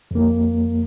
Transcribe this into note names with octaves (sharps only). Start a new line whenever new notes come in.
F2 A#3